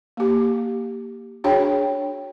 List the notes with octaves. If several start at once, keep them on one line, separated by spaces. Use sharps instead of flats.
A#3 G4
D4 F#4 G#4 C#5 G5 B5